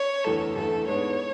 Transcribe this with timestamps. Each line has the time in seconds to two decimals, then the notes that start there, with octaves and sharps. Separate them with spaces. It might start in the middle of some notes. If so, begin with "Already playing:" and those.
Already playing: C#5
0.24 F#1 E2 D3 A3 E4 A4
0.55 F#1 E2 D3 A3 E4 A4
0.88 G#2 G#3 B3 D4 C#5